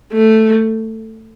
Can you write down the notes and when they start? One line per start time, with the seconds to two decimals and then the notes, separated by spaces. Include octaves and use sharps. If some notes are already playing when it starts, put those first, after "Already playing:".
0.13 A3